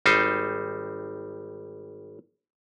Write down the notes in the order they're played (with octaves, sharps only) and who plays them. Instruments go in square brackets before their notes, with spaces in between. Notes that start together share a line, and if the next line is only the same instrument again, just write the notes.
[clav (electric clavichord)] G#1 G3 D#4 C5